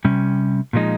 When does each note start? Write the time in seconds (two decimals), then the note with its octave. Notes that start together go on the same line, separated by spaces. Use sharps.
0.05 C3 G3 C#4
0.73 A#2 F3 G#3 D#4